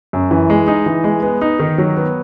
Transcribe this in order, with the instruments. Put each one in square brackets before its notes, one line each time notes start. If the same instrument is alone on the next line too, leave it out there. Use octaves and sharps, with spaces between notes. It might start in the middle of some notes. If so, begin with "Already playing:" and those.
[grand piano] F#2
E3
G#3
D#4
E3
G#3
B3
D#4
D#3
F#3
B3